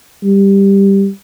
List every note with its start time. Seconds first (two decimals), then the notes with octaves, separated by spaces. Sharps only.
0.24 G3